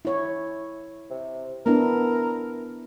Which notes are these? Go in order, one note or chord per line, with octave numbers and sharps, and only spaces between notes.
E4 C#5
C3
B3 D4 E4 A#4